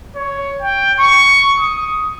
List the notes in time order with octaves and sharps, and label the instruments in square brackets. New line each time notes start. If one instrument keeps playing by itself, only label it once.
[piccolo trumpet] C#5
G5
C#6
D#6